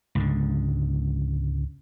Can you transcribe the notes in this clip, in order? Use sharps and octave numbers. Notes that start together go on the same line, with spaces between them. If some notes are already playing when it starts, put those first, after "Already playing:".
C#2 G#2 D3